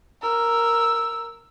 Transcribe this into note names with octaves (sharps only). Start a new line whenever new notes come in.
A#4 E6